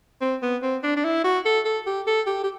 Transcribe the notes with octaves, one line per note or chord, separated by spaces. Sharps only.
C4
B3
C4
D4
D4
E4
F#4
A4
A4
G4
A4
G4
G4